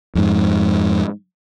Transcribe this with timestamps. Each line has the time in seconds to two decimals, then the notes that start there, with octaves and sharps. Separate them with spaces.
0.15 F2 G#2